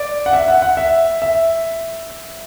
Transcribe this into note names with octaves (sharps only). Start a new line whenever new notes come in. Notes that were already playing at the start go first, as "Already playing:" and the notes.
Already playing: D5
F#5
E5
F#5
F#5
E5
E5